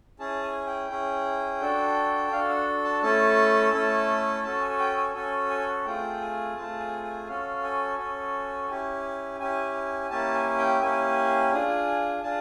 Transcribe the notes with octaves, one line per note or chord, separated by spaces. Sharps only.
C#4 E4 G#4 A5
G#5
G5
C#4 E4 G#4
D4 F#4 A4
D4 F#4 A4 F5
F#5
A5
A3 C#4 E4 A4 A5
A3 C#4 E4 A4
C#4 F#4 A4 A5
G#5
G5
G#5
C#4 F#4 A4 G#5
G#5
F#5
A3 C4 F4 G#4 G5
G#5
A3 C4 F4 G#4 A5
G#5
G#5
C#4 F#4 A4 F5
G#5
C#4 F#4 A4
C#4 E4 G4
C#4 E4 G4 G#5
G#5
A#3 C#4 E4 G4 A5
G#5
G5
A#3 C#4 E4 G4 G#5
D4 F4 G#4
D4 F4 G#4 A5